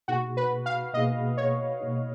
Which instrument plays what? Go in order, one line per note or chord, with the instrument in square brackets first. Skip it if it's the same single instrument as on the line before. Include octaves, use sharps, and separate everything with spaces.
[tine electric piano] B2 A#3 D#4 G#4 [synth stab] F#4
[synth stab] B4
F5
[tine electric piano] B2 A#3 D#4 G#4 [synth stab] D#5
[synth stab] C#5
[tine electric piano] B2 A#3 D#4 G#4